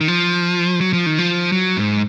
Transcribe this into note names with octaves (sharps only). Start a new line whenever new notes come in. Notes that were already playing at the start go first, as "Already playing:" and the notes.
D#3
F3
F#3
F3
D#3
F3
F#3
G#2